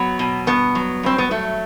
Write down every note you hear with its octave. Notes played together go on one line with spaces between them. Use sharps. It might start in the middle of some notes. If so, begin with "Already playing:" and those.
Already playing: F#3 B3
B2
G2 B3
F#3
G2 C4
B3
F#3 A3